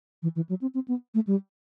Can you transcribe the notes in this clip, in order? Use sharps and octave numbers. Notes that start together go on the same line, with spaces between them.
E3
E3
F#3
C4
C4
B3
A3
G3